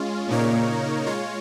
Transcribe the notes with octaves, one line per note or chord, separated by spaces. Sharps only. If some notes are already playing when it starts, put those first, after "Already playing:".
Already playing: G#3 C#4 F4
A#2 C#3 A#3 D#4 A#4 C#5
G#3 F4 C#5